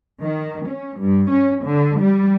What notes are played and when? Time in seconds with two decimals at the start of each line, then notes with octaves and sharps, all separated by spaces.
0.21 D#3
0.68 C#4
0.98 G2
1.29 C#4
1.63 D3
1.98 G3